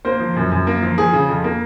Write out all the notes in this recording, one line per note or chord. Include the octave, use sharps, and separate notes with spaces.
A#3 C5
F3
F#2
F#2
A#3
F3
F3 G#4
C#3
F2
A#3